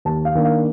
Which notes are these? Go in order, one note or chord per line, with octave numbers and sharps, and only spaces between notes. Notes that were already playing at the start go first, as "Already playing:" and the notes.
D#2 A5
F5
D#3 A#3 D4
F5